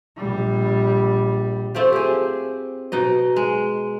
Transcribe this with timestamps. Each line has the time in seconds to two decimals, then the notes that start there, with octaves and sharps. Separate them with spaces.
0.18 A#1 G3
1.75 A3 C4 F4 G4
1.92 G4 G#4
2.92 B2 D#4 D#5
3.36 G#3